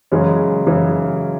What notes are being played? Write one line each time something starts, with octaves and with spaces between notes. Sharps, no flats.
F#2 C#3 E3 G#3 C#4
F#2 C#3 E3 G#3 C#4